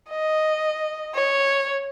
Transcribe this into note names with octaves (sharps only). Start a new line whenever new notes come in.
D#5
C#5